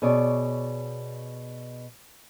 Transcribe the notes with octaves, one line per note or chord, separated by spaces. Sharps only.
B2 G#4 C#5 D5